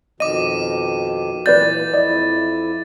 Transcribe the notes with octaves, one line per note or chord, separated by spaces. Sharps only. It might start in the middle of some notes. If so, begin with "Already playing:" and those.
F2 B2 D#3 D#5 D6 D#7
A#2 E3 B4 D5 G6 A6
F2 E4 D5 D#5